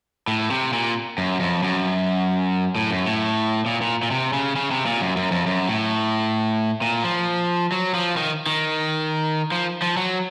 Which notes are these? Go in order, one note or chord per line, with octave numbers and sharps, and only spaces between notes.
A2
C3
A#2
F#2
F2
F#2
A2
F#2
A2
A#2
A#2
A#2
C3
C#3
C#3
C3
A#2
F#2
F#2
F2
F#2
A2
A#2
F3
F#3
F3
D#3
D#3
F3
F3
F#3